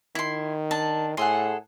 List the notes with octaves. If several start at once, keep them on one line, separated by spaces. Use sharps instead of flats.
D#3 E4 C6
D4 A5
A2 G#4 A4 F#5 C6